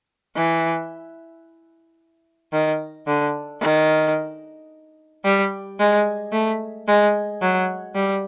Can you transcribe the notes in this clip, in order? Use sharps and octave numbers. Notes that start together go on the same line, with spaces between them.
E3
D#3
D3
D#3
G3
G#3
A3
G#3
F#3
G3